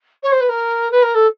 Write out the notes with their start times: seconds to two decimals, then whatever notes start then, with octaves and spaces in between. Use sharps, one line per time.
0.23 C#5
0.31 C5
0.40 B4
0.49 A#4
0.91 B4
1.02 A#4
1.14 A4